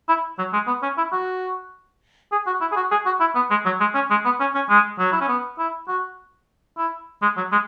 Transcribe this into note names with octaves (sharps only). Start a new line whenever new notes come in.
E4
F#3
G#3
B3
C#4
E4
F#4
G#4
F#4
E4
G#4
F#4
G#4
F#4
E4
B3
G#3
F#3
G#3
C#4
G#3
B3
C#4
C#4
G#3
F#3
E4
C#4
B3
E4
F#4
E4
G#3
F#3
G#3